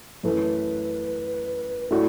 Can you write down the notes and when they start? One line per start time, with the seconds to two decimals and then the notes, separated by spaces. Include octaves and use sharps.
0.23 F#2 E3 A3 B4
1.90 A2 A3 D4 F#4 A4